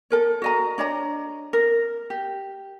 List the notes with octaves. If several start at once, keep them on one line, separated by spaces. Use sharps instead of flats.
A4 A#4 C#5
F#4 D#5 A#5
D4 C#5 D#5 A#5
A#4
G4